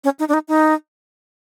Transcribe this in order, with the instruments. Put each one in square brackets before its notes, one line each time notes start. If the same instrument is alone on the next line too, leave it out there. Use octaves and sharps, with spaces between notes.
[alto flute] C#4
D#4
D4
D#4
D#4